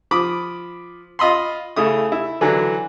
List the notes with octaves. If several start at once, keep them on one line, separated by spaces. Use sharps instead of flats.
F3 B5 D6 D#6
F4 D#5 B5 C6
C#3 A3 E4 D#6
E4
D3 E3 F#3